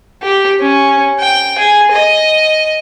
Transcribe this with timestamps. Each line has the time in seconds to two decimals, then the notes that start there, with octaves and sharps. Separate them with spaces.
0.22 G4
0.61 C#4
1.19 G5
1.59 G#4
1.92 D#5